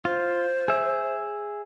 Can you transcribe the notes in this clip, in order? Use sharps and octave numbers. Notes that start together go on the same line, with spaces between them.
F4 C5
G#4 E5